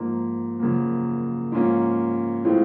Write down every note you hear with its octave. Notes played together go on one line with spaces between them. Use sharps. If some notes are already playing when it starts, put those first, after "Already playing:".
Already playing: G#2 F3 A#3
F#2 C#3 F3 A#3
G#2 F3 A#3 C#4 F4
A2 E3 G#3 C4 F4